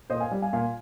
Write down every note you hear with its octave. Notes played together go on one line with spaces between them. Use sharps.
A#2 C5 D#5
F5 G#5
G3
F5 G#5
A#2 F5 G#5